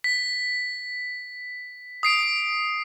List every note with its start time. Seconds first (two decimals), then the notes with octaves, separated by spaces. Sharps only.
0.04 B6
2.03 D#6 C7 D7